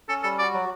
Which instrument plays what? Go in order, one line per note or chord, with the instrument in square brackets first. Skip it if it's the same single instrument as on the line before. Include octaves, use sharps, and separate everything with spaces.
[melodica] C#4 [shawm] A4
[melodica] G3 [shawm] A4
[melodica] F#4 [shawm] D5
[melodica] F#3